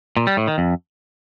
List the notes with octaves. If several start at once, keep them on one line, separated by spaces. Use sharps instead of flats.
A#2
G3
A2
D#3
F2